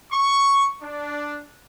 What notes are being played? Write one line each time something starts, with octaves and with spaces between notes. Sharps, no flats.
C#6
D4